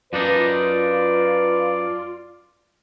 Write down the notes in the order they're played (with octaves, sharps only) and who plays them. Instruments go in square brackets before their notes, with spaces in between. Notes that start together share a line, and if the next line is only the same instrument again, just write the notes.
[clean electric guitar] F#2 D4 D#4 [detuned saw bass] F4 [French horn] B4 [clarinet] D5